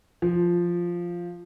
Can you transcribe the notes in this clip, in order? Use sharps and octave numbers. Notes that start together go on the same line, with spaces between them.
F3